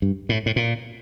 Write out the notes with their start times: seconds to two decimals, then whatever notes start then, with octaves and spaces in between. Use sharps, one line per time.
0.02 G2
0.29 A2
0.46 A2
0.56 A#2